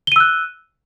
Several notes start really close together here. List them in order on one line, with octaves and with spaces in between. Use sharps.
G7 D#7 E6 F#6